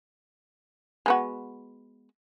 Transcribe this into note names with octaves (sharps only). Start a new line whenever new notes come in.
G#3 B3 F#4